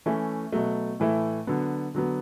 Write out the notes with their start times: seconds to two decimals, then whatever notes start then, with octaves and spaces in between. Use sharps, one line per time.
0.06 E3 A3 C#4 E4
0.52 B2 F#3 A3
1.00 A2 E3 A3 E4
1.47 D3 F#3 B3
1.95 D3 F#3 B3